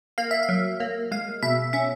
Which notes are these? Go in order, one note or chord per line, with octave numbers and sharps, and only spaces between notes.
A#3 F5
E5
F5
F#3
A#3
G#3 F5
B2 E5
C#4 E5